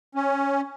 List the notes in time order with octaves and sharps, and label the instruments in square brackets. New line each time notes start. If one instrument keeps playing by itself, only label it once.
[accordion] C#4